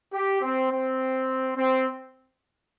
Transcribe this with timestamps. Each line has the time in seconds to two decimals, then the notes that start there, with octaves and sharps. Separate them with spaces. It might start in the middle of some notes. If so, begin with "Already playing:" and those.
0.13 G4
0.41 C4
0.70 C4
1.56 C4